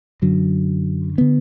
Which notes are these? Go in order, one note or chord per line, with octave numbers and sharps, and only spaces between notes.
F#2 D3 F#3
D3 B3